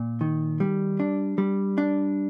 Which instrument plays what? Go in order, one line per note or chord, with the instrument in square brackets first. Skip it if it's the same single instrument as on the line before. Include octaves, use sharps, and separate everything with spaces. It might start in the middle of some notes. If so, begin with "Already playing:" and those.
Already playing: [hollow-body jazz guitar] A#2
D#3
G3
D4
G3
D4